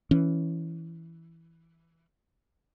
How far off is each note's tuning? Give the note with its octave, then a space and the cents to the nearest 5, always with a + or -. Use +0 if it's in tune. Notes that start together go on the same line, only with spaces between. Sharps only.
E3 +0 C#4 +5